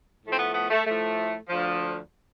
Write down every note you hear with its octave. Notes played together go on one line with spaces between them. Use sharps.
A2 F3 A3
C4
B3
B3
A3
A2 F3 A3
D2 D3 F3